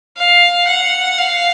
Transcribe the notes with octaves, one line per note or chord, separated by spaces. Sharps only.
F5
F#5
F5